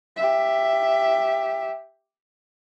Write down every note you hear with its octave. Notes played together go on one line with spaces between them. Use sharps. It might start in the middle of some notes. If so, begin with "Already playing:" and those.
G4 E5